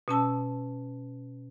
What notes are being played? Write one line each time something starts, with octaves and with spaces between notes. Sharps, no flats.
B2 C#4 A5 E6